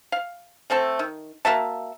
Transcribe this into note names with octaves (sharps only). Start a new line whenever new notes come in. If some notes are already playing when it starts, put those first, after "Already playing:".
F5
A3 C4 A4 A5
D#3
A#3 F#4 E5 A5